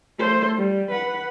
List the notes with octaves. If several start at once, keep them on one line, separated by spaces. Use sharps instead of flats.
A3 C5
G3
B4 F#5